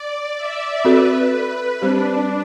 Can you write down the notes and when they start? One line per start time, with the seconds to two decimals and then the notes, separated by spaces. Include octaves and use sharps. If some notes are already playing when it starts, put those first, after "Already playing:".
Already playing: D5
0.37 E5
0.85 C4 F#4 A4 B4
1.82 G3 C4 D4 G4 C5